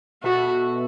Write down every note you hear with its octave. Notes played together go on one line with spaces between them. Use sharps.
B2 B3 F#4 A4 E5